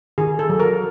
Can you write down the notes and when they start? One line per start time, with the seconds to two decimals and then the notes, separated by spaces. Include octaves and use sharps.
0.18 D#3 G#4
0.39 A4
0.49 F#3
0.60 A#4